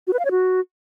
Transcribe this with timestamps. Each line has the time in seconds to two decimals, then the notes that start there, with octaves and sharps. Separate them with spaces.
0.07 F#4
0.13 B4
0.19 F5
0.25 C#5
0.31 F#4